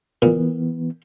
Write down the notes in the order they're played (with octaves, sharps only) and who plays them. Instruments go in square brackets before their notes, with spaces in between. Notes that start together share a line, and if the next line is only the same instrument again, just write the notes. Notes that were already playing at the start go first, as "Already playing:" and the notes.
[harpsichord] A#2 [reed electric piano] E3 B3